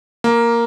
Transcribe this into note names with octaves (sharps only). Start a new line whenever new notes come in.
A#3